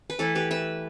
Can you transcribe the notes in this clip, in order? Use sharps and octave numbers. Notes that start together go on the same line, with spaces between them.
B4
E3 A3 E4 A4
G4 B4
B4 E5